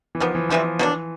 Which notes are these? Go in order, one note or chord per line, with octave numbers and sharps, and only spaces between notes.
E3
D#3 F3 G3 B3
E3
C3 E3 F3 G3 C4
B2 E3 F#3 A#3 D4